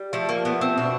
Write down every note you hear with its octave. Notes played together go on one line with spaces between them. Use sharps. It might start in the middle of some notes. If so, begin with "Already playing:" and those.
Already playing: G3
F3 A3
A#3
A3 B3
C4
B2 D4